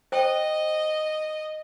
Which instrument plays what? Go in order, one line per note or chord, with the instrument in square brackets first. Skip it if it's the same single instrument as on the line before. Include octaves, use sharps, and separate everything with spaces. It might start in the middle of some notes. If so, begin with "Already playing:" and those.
[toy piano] C5 G5 [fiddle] D#5